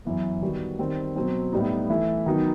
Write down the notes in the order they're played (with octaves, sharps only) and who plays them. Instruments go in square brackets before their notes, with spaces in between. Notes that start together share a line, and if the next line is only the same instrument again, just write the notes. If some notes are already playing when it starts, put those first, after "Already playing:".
[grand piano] F#2 E3 B3
D#3 G3 B3 F#4
D#3 G3 C4
B2 F#3 C4
A2 G3 B3 D#4
E3 A3 E4
D#3 F#3 B3 D#4